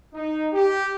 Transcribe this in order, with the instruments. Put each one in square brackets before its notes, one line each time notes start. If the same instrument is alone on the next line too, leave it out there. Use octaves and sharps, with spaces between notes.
[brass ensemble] D#4
G4